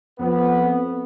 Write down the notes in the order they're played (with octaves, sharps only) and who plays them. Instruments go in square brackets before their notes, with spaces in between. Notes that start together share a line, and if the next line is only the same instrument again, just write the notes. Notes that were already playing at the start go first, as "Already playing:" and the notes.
[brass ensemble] F2 B3